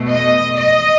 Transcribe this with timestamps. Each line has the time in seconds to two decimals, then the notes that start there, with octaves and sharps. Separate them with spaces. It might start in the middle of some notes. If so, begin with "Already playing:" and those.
Already playing: B2 A3
0.10 D#5
0.56 D#5